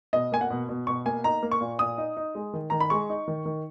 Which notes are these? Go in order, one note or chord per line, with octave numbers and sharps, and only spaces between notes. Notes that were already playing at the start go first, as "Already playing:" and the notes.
B2 D#5
A#3 G#5
F#5
B2
B2
B2 C#6
A#3 G#5
D#4 A#5
A#3
C#6
A#2
A#2 D#6
D#4
D#4
G#3
D#3
D#3 A#5
B5
G#3 C#6
D#4
D#3
D#3